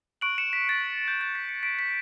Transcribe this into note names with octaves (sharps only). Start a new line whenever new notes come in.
C#6 F#6 D7 F#7
C#7 E7
B6
A6 C#7
G6
A6
B6
C#7
B6 D7
B6